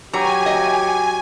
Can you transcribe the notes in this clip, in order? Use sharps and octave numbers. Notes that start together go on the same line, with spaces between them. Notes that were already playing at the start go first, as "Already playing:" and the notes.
F#3 G4 G#5 A#5
D#5